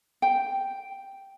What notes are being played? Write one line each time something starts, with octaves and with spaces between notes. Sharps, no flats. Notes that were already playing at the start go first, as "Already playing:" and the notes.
G5